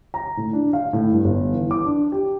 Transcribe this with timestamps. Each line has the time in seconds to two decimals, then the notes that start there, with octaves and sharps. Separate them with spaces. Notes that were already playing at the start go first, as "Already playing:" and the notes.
0.14 A#5
0.37 A2
0.53 D4
0.73 F5
0.93 A2
1.12 G2
1.24 G1
1.52 E3
1.71 D6
1.85 D4
2.12 G4